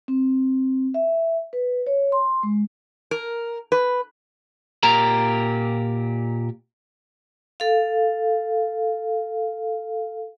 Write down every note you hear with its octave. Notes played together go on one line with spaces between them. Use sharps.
C4
E5
B4
C#5
C6
G#3
A#4
B4
A#2 G4 A#4 A#5
A4 F5